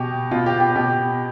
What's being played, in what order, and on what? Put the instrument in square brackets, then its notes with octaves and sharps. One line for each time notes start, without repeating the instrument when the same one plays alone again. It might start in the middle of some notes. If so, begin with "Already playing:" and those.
Already playing: [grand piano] B2 G4
B2 F4
G4
G4
B2 G4